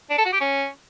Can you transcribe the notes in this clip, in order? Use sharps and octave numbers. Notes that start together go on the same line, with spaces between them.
D4
A4
F#4
G4
C#4